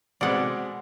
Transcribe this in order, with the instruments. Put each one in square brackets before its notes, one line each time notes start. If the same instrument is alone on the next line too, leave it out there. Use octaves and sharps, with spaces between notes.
[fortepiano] B2 G#3 C4 [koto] D5 F#5